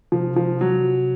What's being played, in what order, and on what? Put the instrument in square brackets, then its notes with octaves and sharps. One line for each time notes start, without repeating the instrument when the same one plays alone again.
[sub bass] C3 [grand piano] F3
[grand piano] F3
F#3